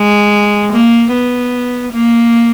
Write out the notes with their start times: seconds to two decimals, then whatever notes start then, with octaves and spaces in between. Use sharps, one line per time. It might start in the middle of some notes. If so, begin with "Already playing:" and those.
Already playing: G#3
0.73 A#3
1.12 B3
1.93 A#3